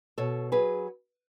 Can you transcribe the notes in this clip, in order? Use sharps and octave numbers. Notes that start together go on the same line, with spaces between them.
B2 A4 C#5
F#3 G#4 B4